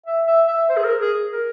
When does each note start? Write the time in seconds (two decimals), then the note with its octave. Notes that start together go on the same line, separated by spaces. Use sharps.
0.06 E5
0.27 E5
0.48 E5
0.69 C5
0.77 G#4
0.84 A#4
1.01 G#4
1.32 A#4